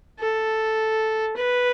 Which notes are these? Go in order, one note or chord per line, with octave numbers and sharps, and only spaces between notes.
A4
B4